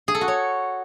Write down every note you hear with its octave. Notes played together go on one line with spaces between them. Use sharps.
G#4
A4
F#4
C#5